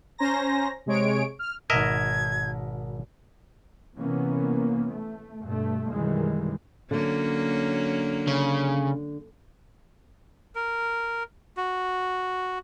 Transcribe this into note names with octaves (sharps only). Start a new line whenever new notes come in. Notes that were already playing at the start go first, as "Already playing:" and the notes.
C#4 C5 G#5 A#5 A#6
C3 G#3 C#5 D7
F6
G#1 B2 A#4 D#5 E5 A5 G#6
C3 E3 A#3 B3 C#4
A3
G2 B2 A3
F#2 B2 D#3 E3 G3 G#3
D3 F#3 A#3 C#4
C#3
A#4
F#4